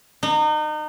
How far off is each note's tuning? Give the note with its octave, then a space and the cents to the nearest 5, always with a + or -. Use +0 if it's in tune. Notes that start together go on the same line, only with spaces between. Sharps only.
D#4 -35